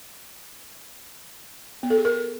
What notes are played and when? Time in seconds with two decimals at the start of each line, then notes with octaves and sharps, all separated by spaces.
1.83 B3
1.90 A4
1.98 G#4
2.05 A#4